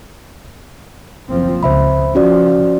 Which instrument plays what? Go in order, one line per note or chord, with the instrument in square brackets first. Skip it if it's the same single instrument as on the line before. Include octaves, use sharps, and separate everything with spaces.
[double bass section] F#1 F3 C4
[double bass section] C#2 [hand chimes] C5 E5 B5
[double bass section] F3 [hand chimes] C#4 F#4 D5